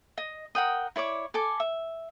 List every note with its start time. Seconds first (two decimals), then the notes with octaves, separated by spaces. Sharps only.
0.18 D#5
0.55 A#4 F#5 G5 D#6
0.96 E4 C#5 D5 D6
1.34 A4 G#5 D6
1.60 E5